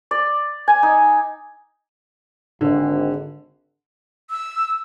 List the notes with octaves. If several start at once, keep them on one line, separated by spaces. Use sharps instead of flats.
D5
G#5
D#4
G#1 D3
E6